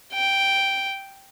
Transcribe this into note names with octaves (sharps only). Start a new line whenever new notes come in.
G5